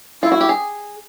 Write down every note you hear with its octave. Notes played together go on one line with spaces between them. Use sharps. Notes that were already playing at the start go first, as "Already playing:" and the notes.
E4 F4
F#4
G4
G#4